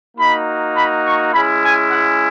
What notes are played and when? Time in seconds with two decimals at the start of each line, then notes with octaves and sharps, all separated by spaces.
0.16 A#3 D#4 F#4 B5
0.75 B5
1.04 C#6
1.32 G#3 C#4 E4 B5
1.62 G#5
1.91 F#5